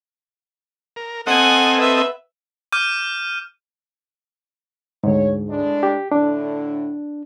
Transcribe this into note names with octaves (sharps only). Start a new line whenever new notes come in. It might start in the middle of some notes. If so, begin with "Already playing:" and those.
A#4
C4 A4 D#5 F#5 G#5
B4 E5
D6 F6 G6 D#7
D2 G#2 C#5
A2 G#3 D4
G4
A2 D3 D4